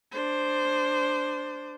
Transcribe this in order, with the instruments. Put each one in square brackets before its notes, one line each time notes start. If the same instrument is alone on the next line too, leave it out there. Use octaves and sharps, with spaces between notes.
[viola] D4 C5